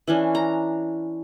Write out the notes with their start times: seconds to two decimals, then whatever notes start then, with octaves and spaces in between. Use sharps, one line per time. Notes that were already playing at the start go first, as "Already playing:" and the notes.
0.08 E3 C#4 D4
0.35 A#5